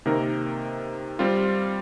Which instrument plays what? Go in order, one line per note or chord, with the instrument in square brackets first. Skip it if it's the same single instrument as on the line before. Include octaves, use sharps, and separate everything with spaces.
[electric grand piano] C3 D#3 A#3 D#4 A#4
G3 C4 F4